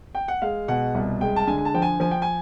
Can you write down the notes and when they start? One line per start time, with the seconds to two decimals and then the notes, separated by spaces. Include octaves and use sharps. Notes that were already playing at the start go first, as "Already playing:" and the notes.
0.15 G5
0.28 F#5
0.42 G#3 F5
0.68 B2 F#5
0.95 C2
1.21 G#3 G5
1.36 A5
1.47 D3 G#5
1.58 G#5
1.65 A5
1.74 F3 G5
1.82 G#5
2.00 F3 G#5
2.11 G5
2.22 G#5